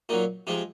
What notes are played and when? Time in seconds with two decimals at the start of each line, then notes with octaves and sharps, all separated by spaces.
0.09 A#2 F#3 D#4
0.47 C3 F3 G#3 D#4